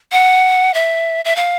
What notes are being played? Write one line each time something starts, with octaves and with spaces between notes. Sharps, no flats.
F#5
E5
E5
F5